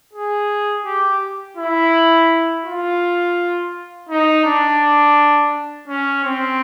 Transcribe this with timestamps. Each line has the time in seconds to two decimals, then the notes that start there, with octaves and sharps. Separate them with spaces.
0.13 G#4
0.85 G4
1.57 E4
2.65 F4
4.09 D#4
4.44 D4
5.88 C#4
6.24 C4